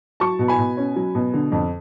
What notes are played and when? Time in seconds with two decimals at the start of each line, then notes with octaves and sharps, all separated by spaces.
0.20 F#3 A5 C#6
0.39 B2
0.48 G#5 B5
0.58 B2
0.77 C#4
0.96 F#3
1.15 B2
1.34 D3
1.52 F2